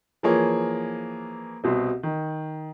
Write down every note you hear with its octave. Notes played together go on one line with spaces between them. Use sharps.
E3 F3 A#3 G#4 C#5
C2 B2 C4
D#3